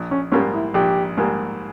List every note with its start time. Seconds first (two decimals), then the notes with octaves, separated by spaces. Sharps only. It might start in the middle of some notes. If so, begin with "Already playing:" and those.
Already playing: A#1
0.11 C#4
0.32 G#2 G3 A#3 C#4
0.53 E4
0.74 A#1 G4
1.17 G#2 G3 A#3